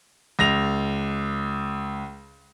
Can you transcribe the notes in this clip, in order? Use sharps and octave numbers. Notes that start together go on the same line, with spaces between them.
C#2 A#6 F7